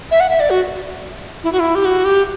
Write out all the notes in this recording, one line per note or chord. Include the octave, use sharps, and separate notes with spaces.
E5
F#5
E5
D5
F#4
E4
F#4
E4
G4
F#4
G4